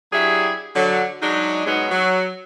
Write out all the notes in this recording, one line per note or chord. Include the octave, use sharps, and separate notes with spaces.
F#3 D4 E4 G4 G#4
D3 F#3
F#3 G#3 D4 D#4
G#2 F#3 B3 D#4 G#4
F#3